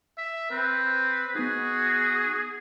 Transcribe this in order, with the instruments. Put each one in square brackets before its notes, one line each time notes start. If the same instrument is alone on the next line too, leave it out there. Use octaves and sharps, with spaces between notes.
[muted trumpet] E5
[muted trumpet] C4 [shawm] B4
[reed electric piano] B3 D#4 [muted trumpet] F#4 [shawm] G#4